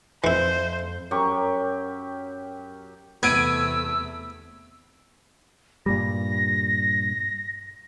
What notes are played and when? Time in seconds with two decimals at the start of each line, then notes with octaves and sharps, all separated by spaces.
0.24 F2 E3 E4 C5
1.11 F#2 G4 A#5 C#6
3.23 E2 C3 A3 B3 E6 G#6 D7 D#7
5.86 G2 A#2 G3 A#6